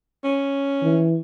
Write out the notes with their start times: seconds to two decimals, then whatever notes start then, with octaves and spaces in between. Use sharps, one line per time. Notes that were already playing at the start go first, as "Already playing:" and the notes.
0.24 C#4
0.83 E3